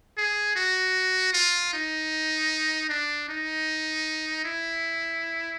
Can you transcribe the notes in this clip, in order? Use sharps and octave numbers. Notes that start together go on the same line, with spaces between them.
G#4
F#4
F4
D#4
D4
D#4
E4